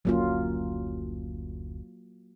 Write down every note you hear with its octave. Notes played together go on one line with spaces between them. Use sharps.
F#1 D2 F#3 A#3 C#4 F4